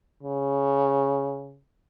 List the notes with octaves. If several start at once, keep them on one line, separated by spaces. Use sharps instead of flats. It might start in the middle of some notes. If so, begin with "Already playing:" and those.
C#3